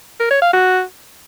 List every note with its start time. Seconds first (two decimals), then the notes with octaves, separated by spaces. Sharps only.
0.20 A#4
0.31 C#5
0.42 F5
0.53 F#4